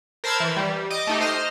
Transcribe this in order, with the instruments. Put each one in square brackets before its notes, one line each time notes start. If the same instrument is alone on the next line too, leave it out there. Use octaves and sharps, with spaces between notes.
[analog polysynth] A#4 C5 A5 B5 E6 G#6
E3
G3
D#5 D6 D#6
A3 D#4 G4
C5 D#5 F6